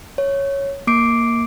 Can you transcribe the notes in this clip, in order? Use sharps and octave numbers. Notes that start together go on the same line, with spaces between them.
C#5
A#3 D6 C7 D7